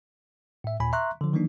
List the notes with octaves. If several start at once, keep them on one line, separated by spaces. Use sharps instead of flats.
A2 E5
D#2 A#2 G#5 B5
E5 A#5 C6 C#6 F#6
D3 F3
D#3 E3 F#3 A#3 D4 D#4